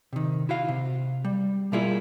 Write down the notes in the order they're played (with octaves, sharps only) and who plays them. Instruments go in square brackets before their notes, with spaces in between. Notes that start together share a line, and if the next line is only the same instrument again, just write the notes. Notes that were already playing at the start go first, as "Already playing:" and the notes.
[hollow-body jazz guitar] C3 D#3
E4 F#4 F5
C3
G3
B2 G3 A#3 E4 F4 G#4